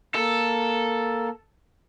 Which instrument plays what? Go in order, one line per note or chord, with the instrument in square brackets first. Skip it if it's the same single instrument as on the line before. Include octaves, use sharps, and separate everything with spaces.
[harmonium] A#3 [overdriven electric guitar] A4